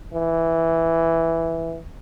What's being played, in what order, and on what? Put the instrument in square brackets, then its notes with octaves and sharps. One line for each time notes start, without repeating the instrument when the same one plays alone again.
[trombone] E3